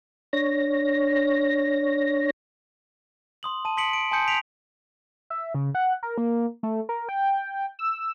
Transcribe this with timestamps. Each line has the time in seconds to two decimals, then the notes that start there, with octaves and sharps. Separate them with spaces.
0.33 D4 C#5 A#6
3.43 C6 D#6 F#7
3.65 A5 D#7
3.77 C6 D#6 B6 C#7 D7 F#7
3.93 D7
4.11 G#5 A5 C6 D#6 G6 C#7
4.28 B6 D7 F7 F#7
5.30 E5
5.55 C#3
5.75 F#5
6.03 A#4
6.18 A#3
6.63 A3
6.89 A#4
7.09 G5
7.79 E6